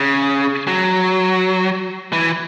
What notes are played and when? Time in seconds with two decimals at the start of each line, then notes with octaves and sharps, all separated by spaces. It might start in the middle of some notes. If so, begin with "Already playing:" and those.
Already playing: C#3
0.67 F#3
2.13 E3